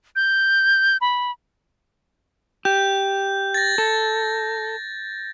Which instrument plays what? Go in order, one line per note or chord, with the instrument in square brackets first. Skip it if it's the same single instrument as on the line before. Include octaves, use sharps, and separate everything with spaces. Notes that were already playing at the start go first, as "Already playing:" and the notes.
[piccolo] G6
B5
[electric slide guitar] G4 [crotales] G6
[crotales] A6 A#6
[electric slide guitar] A4